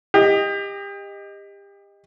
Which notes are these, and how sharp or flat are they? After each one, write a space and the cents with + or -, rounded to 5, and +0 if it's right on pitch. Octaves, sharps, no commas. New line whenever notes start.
G4 +30 D#5 +0